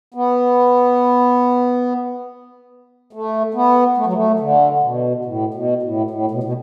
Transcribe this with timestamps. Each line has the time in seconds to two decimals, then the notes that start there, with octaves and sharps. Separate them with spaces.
0.14 B3
3.13 A3
3.54 B3
3.98 A3
4.06 F#3
4.13 A3
4.40 D3
4.83 B2
5.25 A2
5.54 B2
5.83 A2
6.11 A2
6.31 B2
6.43 B2